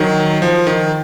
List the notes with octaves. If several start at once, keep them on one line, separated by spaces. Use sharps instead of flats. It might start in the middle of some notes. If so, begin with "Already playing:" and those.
Already playing: D#3 F#3
F3
D#3